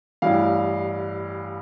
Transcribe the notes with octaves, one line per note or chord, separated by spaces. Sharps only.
A1 G2 E3 F5